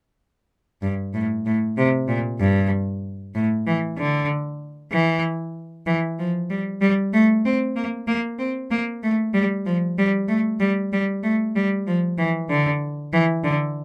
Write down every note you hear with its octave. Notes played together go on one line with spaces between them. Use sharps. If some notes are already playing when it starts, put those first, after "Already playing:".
G2
A2
A2
C3
A#2
G2
A2
E3
D3
E3
E3
F3
G3
G3
A3
C4
A#3
A#3
C4
A#3
A3
G3
F3
G3
A3
G3
G3
A3
G3
F3
E3
D3
E3
D3